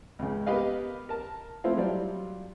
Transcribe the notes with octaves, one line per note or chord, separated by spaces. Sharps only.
C#2 C#3
B3 G4 A#4 B4 D#5 F5
A#4 A5
F3 A3 C4 E4 F4
F#3 G3 F4 D5